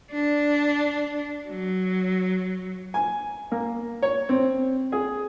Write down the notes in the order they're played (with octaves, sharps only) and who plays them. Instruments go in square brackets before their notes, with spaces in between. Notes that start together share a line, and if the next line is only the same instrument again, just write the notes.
[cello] D4
F#3
[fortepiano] G#5
A#3
C#5
C4
G#4